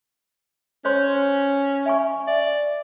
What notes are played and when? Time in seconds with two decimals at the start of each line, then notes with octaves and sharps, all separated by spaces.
0.85 C#4 C5 C#5 C6
1.86 E5 G#5 C#6
2.28 D5 E5